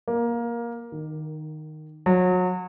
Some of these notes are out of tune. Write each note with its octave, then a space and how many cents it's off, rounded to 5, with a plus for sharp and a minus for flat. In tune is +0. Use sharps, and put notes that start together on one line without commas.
A#3 +15
D#3 -10
F#3 -30